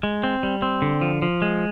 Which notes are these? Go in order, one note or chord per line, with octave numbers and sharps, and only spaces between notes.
G#3
C4
G3
C4
D3
F3
F3
G#3